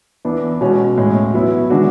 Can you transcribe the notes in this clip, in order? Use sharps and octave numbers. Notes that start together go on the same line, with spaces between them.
E3 B3 D4
B2 G#3 C#4 F#4
A2 G#3 C#4
F#3 B3 E4
D3 G#3 D4 F#4